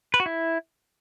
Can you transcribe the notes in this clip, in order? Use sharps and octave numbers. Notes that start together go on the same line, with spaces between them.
B4
F#4
E4